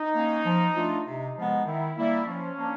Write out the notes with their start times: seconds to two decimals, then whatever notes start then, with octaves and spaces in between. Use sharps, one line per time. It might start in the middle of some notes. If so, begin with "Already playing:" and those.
Already playing: D#4
0.14 A#3 C#4
0.45 F3
0.75 A3 D4 F4
1.05 C3 D#4
1.35 F3 G#3 B3
1.65 D#3 E4
1.96 G3 A#3 E4
2.27 F3 C#4
2.57 A#3 D4